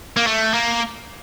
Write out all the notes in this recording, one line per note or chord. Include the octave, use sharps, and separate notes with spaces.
A#3
A3
A#3